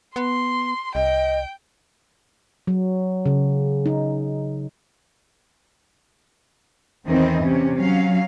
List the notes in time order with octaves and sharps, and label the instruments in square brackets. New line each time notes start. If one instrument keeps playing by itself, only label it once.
[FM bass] B3 [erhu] C6
[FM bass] C2 [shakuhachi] D#5 [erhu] G5
[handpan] F#3
C#3
D#4
[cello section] E2 D#3 E3 C4 D#5
C3 C#4
F#3 C#4 F5